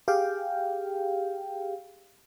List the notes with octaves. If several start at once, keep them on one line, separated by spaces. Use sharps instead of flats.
G4 G#4 F5 G5